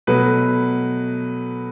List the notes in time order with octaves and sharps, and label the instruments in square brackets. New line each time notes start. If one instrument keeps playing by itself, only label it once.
[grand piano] B2 F#3 A3 B4